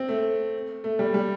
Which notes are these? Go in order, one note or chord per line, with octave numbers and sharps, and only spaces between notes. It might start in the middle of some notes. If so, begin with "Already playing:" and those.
Already playing: C4
A3
A3
G3
G3